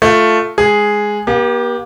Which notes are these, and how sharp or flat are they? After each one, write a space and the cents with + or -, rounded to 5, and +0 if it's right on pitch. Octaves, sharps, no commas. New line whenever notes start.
A3 +0 F4 +0
G#3 +0 G#4 +0
A#3 +45 G4 +0